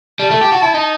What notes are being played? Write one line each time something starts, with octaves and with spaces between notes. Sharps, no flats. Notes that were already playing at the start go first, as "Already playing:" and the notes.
G3 A5
A3
G4
F#4
E4
D#4